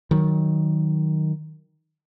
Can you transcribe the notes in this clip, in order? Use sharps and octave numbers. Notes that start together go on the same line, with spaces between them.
D#3 F#3